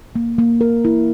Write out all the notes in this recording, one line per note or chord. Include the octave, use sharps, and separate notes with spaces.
A#3
A#3
A#4
E4